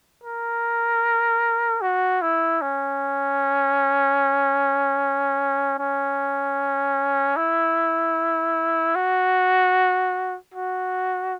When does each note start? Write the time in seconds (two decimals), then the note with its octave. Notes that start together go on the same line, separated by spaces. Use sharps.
0.24 A#4
1.81 F#4
2.22 E4
2.62 C#4
5.79 C#4
7.37 E4
8.95 F#4
10.54 F#4